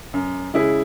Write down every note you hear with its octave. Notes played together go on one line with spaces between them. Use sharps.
F#2
C#3 G#3 E4 G#4